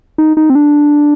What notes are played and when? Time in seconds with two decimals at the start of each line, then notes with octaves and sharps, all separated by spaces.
0.18 D#4
0.37 D#4
0.50 C4
0.55 D4